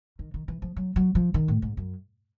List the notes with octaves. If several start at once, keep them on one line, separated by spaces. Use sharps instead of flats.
D#3
D#3
E3
F3
F#3
F#3
F3
D#3
A2
G#2
F#2